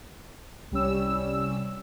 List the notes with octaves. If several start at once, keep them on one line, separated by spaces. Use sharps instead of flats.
C2 G3 C#4 E6